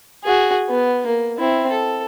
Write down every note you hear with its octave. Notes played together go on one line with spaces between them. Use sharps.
F#4 G#4
B3
A#3
C4 E4
A4